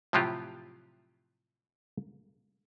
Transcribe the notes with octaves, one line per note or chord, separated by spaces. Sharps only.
A2 C3 F3 F#3 F4 G4